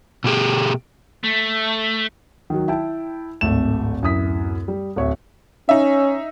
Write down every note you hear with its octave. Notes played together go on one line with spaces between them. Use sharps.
B2 A3 G4 G#4
A3
D#3 F#3
E4 G5 A5
D1 G#1 A3 E7
D1 F#2 E4 D#6 B6
G3
D1 C#5 E5
C#4 D#4 E5